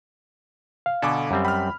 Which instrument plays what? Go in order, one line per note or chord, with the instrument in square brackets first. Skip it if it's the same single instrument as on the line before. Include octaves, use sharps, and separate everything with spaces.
[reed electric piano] F5
[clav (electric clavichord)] B2 A4 [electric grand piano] D3 G#5 D6
[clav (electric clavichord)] F#2 G3 C4
[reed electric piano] G5 [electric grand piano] B5 F6